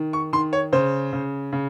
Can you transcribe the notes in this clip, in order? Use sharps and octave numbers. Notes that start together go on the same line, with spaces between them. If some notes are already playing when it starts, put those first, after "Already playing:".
Already playing: D#3
C#6
D#3 C6
C#5
C#3 C5
C#3
C#3